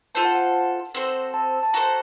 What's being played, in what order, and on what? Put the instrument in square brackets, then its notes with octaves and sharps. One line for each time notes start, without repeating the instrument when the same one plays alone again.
[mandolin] F4 A4 C5 [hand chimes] A5
[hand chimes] F#5
F#5
[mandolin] C4 F#4 A4 C5
[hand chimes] A5
A5
[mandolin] F#4 A4 C5 [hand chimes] A#5